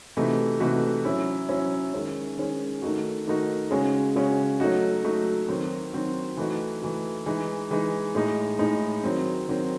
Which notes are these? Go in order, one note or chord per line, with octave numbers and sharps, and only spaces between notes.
C3 E3 A3 D#4 F#4
C3 E3 A3 D#4 F#4
F#3 C#4 E4
F#3 C#4 E4
D#3 G#3 C#4
D#3 G#3 C#4
D#3 A3 D#4 F#4
D#3 A3 D#4 F#4
C#3 G#3 C#4 F#4
C#3 G#3 C#4 F#4
F#3 A3 D#4 F#4
F#3 A3 D#4 F#4
D#3 F#3 C4 F#4
D#3 F#3 C4 F#4
E3 A3 D#4 F#4
E3 A3 D#4 F#4
E3 G#3 D#4
E3 G#3 D#4
A2 G#3 D#4
A2 G#3 D#4
D#3 F#3 C4
D#3 F#3 C4